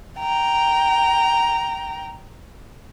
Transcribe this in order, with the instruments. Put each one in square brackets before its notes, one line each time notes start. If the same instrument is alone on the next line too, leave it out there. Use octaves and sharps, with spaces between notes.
[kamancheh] G5 A#5